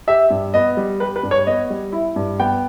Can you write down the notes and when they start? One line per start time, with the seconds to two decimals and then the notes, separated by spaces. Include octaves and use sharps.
0.07 G4 E5
0.30 G2
0.54 B3 D#5
0.77 G3
1.00 G4 B4
1.16 B4
1.23 G2
1.31 C#5
1.47 B3 D#5
1.70 G3
1.92 E4
2.16 G2
2.40 B3 G5